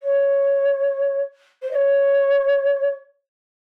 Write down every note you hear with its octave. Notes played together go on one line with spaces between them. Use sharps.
C#5
C5
D#5
C#5